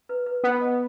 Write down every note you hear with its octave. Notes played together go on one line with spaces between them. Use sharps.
B4
B4
B3 B4
D#5